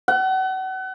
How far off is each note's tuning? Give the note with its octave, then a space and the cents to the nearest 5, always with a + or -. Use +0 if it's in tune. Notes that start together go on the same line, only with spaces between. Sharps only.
F#5 +35